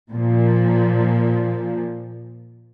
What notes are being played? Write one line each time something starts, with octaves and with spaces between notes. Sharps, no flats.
A#2 F3